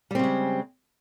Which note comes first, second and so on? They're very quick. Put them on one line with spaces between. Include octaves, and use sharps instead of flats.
G3 C4 C#3 G#3